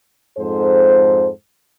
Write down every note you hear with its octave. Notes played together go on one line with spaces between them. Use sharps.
F2 G#2 A4 C5